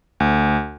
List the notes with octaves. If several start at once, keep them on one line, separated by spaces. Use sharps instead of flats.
D2